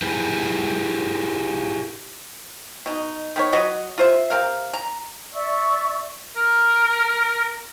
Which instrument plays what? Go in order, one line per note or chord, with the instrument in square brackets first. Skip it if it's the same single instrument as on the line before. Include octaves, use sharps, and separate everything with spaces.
[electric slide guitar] E4 G4 G#4 B4
[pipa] B2 D#4
D#3 B3 C#5
F#3 F#4 B4 D#5
F4 C5 E5
C3 A#4 F5
A#5
[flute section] D5 E5 C#6 E6
[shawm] A#4